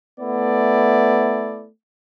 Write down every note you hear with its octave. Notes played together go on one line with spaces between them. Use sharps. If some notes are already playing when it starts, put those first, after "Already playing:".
A3 B3 E4 D5